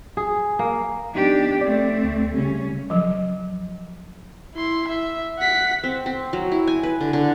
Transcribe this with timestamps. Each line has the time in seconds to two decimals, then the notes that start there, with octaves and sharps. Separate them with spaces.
0.17 G#4
0.59 A#3
1.14 F3 B3 D4 D#4 G4
1.61 A3 C4 D5
2.04 D2
2.34 C#3 G3 C#4
2.90 F3 F#3
4.55 E4 C6
4.88 E5
5.39 F#5 B6
5.84 C4
6.06 C4
6.33 F#3
6.52 E4
6.67 G#5
6.83 B4
7.01 D3
7.13 D3